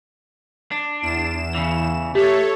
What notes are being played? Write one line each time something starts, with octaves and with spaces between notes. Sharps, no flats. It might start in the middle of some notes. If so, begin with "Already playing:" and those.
D4
E2 E7
C#3 E3
A3 G4 A4 C#5